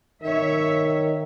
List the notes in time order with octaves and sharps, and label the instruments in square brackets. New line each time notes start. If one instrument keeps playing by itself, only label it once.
[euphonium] D#3 [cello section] C#5 E5